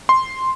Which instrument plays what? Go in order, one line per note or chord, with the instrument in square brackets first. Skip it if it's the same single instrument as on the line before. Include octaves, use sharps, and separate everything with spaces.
[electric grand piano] C6